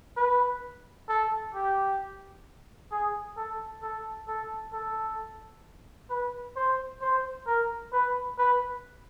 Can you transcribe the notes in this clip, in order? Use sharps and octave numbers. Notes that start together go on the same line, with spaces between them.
B4
A4
G4
G#4
A4
A4
A4
A4
B4
C5
C5
A#4
B4
B4